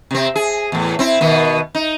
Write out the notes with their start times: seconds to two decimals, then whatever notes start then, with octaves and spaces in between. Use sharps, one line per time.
0.11 C3 C4
0.36 G#4
0.72 E2 A2
0.99 C4 E4
1.21 B2 D#3 B3
1.75 D#4